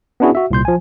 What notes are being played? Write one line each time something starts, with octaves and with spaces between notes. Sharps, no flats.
B3 C#4 D4 E4 F#4 G#4
F#4 E5
C2 A#2 C6 G6
F3 G#5